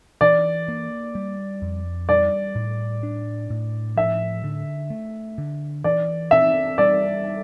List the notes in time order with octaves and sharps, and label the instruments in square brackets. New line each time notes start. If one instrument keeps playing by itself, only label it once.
[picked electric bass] E3 [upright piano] D5
[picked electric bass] A#3
G3
F2
[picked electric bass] G3 [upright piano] D5
[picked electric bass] A2
D4
A2
[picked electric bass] F3 [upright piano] E5
[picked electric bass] D3
A3
D3
[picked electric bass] E3 [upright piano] D5
[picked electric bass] C4 [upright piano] E5
[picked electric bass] G3 [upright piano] D5